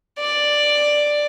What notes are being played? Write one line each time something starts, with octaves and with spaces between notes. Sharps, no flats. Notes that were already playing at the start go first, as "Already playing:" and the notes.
D5